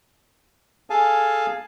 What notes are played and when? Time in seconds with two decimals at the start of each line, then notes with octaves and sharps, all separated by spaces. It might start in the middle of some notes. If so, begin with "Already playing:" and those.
0.90 G#4 A4 F5 G#5 A5